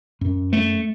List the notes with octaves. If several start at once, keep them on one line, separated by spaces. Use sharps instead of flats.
F#2
A3